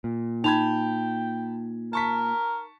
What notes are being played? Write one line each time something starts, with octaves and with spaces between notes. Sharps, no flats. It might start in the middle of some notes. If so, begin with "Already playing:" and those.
A#2
D#4 G5 A5 B5 G#6 F7
A#4 A5 C#6 B6